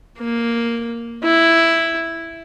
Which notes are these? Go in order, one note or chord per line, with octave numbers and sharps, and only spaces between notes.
A#3
E4